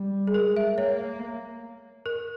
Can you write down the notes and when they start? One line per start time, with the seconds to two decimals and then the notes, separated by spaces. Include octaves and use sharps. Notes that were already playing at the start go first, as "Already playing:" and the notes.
Already playing: G3
0.27 G#4
0.34 G#3 A#4
0.57 E5
0.77 A#3 C#5
2.06 A#4